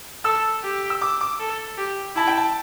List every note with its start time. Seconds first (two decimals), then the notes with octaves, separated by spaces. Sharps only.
0.24 A4 E6
0.63 G4
0.90 E6
1.01 D6
1.21 D6
1.40 A4
1.78 G4
2.16 E4 A5
2.27 G5
2.37 A5